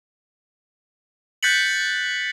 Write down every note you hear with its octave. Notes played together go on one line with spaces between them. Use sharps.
F#6 G6 A6 B6 C#7 F#7